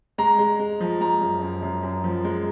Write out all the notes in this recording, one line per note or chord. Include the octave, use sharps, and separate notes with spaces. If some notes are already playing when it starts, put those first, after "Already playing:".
G#3 A#5
G#3
G#3
F3
G#3 A#5
F#2
F#2
F#2
F#2
F3
G#3